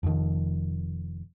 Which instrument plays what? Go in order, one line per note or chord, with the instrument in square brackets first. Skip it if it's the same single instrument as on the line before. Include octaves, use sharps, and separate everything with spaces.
[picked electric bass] F1 F2 G#2 D#3